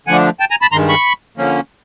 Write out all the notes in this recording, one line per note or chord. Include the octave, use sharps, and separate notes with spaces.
D3 F3 A3 D4 F#5 G#5
G5 A5
G#5 A#5
A5 B5
G2 D#3 G#3 A#5 C6
B5 C#6
D3 F3 A#3 C#4